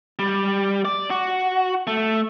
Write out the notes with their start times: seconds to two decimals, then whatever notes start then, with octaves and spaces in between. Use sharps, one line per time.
0.19 G3
0.85 D5
1.10 F#4
1.87 A3